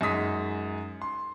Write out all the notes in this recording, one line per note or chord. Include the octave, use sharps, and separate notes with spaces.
F#2 G#3 D#4 D#6 B6
C6